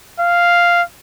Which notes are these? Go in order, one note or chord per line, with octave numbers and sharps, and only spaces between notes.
F5